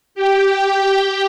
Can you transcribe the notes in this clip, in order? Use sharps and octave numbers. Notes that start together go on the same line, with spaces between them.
G4 G5